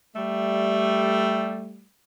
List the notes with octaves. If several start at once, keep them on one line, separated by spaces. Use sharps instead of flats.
G3 A3